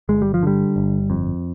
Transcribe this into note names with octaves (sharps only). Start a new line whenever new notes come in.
G1 G#3
G3
F3
D3 G3
G1
F2